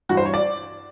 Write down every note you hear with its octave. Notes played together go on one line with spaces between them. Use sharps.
G2 E3 G3 F#4
C5
C#5
D5